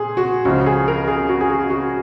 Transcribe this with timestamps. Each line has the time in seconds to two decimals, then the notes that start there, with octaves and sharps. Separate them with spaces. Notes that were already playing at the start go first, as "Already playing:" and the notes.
Already playing: A#2 G#4
0.17 F#4
0.45 C#2 C#3 F3 F#4
0.66 G#4
0.88 A#4
1.08 G#4
1.29 F#4
1.41 G#4
1.50 F#4
1.70 F#4